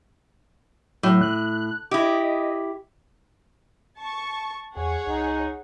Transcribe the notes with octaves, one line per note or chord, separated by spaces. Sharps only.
A2 F#3
F#6
E4 G4 D#5
A5 C#6
E2 G#4 C#5 F#5
C2 D#4